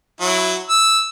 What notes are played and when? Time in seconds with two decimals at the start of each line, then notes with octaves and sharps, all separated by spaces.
0.21 F#3 E4
0.70 E6